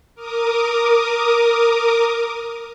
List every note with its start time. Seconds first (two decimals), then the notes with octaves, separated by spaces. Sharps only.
0.15 A#4 D6 D#6